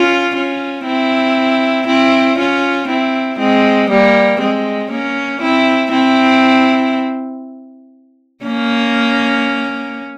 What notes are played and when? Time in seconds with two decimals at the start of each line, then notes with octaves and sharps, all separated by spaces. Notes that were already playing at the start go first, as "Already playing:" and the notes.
Already playing: C#4 F4
0.35 C#4 F4
0.86 C4 E4
1.87 C4 E4
2.38 C#4 F4
2.88 C4 E4
3.39 G#3 C4
3.90 G3 A#3
4.40 G#3 C4
4.91 A#3 C#4
5.41 C4 E4
5.91 C4 E4
8.45 A#3 C#4